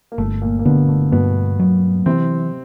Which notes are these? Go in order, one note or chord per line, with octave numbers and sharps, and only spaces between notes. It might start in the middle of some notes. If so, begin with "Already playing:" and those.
A#3
G1 A3
A#2 A#3
A#3
B2 D3 B3
A3
G2 B2 B3
F#3
C3 E3 C4